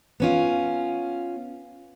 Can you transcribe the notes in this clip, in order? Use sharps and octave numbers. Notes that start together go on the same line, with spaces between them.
B3 C#4 F4